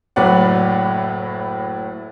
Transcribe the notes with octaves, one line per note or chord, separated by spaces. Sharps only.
F#1 A2 F#3 B4 D5 F#5